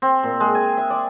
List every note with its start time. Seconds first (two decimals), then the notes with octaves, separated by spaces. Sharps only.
0.02 C4
0.23 A#2
0.40 G#3
0.55 G#5
0.77 E5
0.90 D5